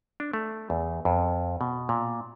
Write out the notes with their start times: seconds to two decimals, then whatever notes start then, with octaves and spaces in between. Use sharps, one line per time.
0.20 D4
0.33 A3
0.70 E2
1.05 F2
1.61 B2
1.89 A#2